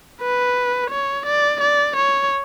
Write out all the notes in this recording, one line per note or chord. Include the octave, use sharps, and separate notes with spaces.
B4
C#5
D5
D5
C#5